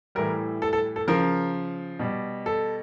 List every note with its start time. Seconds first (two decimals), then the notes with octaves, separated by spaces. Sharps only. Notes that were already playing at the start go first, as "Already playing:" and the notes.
0.15 A2 E3 G3 A#4
0.62 A4
0.73 A4
0.96 A4
1.08 C#3 F3 A#4
1.99 B2 G3
2.46 A4